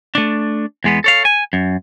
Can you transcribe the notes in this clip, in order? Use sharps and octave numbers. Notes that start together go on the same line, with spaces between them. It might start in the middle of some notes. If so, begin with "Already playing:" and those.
A3 D4
E2 G#3 B3
A4 C#5 F5
G#5
F#2